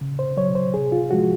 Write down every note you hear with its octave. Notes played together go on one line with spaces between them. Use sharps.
C#3
C5
F#3 C#5
C5
C3 G#4
F4
F3 G#3 F#4